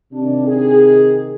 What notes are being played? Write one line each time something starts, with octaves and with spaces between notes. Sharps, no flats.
C3 D#3 D4
G#4